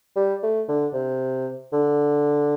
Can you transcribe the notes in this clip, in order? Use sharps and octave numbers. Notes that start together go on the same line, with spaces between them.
G3
A3
D3
C3
D3